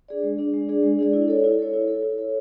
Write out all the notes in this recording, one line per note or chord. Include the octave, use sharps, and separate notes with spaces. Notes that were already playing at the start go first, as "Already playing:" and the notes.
D4 G#4 D5
G#3
D4 G#4 D5
G#3
D4 G#4 D5
G#3
D4 G#4 D5
E4
A4 C#5
E4
A4 C#5
E4
A4 C#5
E4
A4 C#5